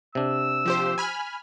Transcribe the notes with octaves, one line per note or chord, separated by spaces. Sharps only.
C3 D4 E6
F3 G4 C5
G#5 B5 F6